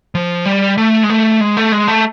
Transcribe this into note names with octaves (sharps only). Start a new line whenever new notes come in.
F3
G3
A3
G#3
A3
G#3
A3
G#3
A3